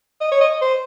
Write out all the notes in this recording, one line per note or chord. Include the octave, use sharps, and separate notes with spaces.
D#5
C#5
D#5
C5